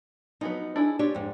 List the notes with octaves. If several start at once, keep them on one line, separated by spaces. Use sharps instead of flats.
F3 F#3 B3 D#4
D4 E4 G#4
D4 F4 G4 C#5
F2 G#2